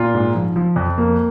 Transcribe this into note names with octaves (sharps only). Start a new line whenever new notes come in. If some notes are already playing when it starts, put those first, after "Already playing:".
Already playing: A#2 F4
G#2
F3
F3
F2
A#3